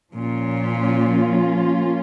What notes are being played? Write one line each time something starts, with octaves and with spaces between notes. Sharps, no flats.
A#2 F3 A#3 C#4 F4